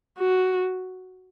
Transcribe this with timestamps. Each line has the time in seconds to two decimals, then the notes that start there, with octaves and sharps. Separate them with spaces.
0.18 F#4